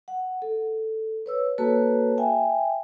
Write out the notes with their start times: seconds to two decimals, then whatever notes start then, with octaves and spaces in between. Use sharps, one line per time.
0.08 F#5
0.42 A4
1.26 B4 C#5 E6
1.58 A#3 F#4 A4 B4 C#5 A5
2.18 E5 G5 G#5